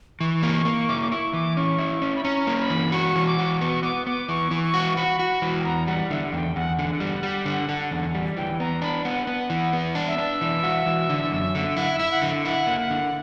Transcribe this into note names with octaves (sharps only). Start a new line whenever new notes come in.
E3 C#6
A#3
C#6
A#3
E4 D6
D6
E4 C#6
E3 D6
C#4 C#6
E4
C#4
B5
C#4 A#5
A#3
B5
E3
F#4 C#6
E3
D6
F#4
B3 C#6
B3 D6
B3 D6
E3 C#6
E3
C#6
F#4
F#4 B5
F#4
E3
G5
E2 A#5
G3 F#5
D3 E5
E2 G5
E2 F#5
D3 F#5
G3
G3
D3
D3
E2
G3
E3 G5
B3 A#5
D4 B5
B3 F#5
B3
E3
B3
D4
E5
D4
E3
F#4
E3
D3
F#2
D3
E4 F#5
E5
E4
F#5
D3
E5
E4 F#5
A#3
F#5
D3